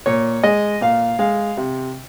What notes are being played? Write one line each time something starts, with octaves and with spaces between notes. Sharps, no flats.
A#2 C#5
G#3 D#5
A#2 F5
G#3 F5
C3